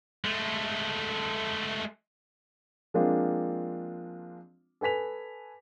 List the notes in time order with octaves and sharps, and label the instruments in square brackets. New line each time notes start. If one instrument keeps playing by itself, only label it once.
[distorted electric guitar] G#3 A3
[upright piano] F3 G#3 A#3 C4 D4 F4
A4 B4 G#5 B6 F7